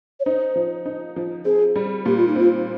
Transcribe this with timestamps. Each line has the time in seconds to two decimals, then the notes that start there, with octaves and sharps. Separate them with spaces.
0.20 C#5
0.25 D#4 C5
0.56 F3
0.86 D#4
1.16 F3
1.45 C4 G#4
1.76 G3
2.06 A#2 G4
2.17 F4
2.28 D#4
2.36 C4 F4